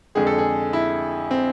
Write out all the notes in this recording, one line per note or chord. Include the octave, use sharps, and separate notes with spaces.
F2 D3 G#3 G#4
A4
G#4
E4
C4